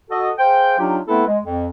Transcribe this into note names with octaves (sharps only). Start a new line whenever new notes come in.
F#4 A4 D#5
G#4 C5 F5 G5
F#3 D4 D#4 F4 G4
A3 B3 C4 E4 A4 B4
G#3
F2